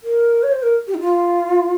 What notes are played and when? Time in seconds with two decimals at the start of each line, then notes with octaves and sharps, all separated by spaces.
0.03 A#4
0.43 C#5
0.52 C5
0.63 A#4
0.88 G4
0.94 D#4
1.00 F4